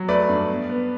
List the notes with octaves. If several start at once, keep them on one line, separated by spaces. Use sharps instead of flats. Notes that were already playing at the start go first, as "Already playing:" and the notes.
Already playing: F#3
A3 B4 D5
G2
B3
B3